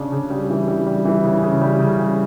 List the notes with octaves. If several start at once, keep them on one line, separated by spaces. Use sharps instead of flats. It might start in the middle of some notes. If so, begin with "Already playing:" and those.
Already playing: C#3 D4
C#3
G3
E3
G3
G3
E3
C#3
C#3
G3
C#3
G3